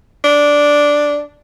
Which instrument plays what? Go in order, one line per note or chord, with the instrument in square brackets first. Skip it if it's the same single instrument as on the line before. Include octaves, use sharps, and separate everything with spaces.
[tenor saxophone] D4